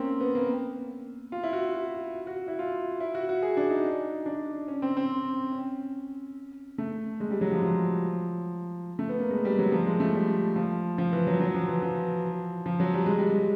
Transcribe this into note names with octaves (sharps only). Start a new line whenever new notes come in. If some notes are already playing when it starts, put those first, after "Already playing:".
Already playing: A#3 C4 C#4
B3
A#3
F4
E4
F#4
F#4
F#4
E4
F4
E4
F#4
F#4
G#4
D4
D#4
D4
C#4
C4
C4
C#4
A3
G#3
G3
F#3
F3
F3
A3
B3
A#3
G#3
G3
F#3
F3
G#3
A3
G3
F3
F3
E3
F#3
F#3
F3
E3
F3
F3
F#3
G3
G#3
G3
G#3